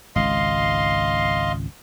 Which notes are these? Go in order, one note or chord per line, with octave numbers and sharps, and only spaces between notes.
G#1 C#2 D#5 F5 C6